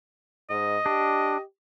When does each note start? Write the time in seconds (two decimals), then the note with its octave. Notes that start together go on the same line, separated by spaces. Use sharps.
0.50 G#2 D#5
0.86 D4 G4